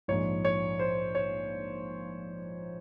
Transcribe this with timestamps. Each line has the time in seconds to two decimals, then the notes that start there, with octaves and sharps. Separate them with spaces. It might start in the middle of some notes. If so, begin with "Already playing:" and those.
0.08 A#1 G#2 F3 C#5
0.45 C#5
0.79 C5
1.15 C#5